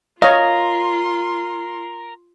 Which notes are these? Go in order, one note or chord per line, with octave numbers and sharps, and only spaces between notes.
F4 A#4 C#5 D#5 F5 C6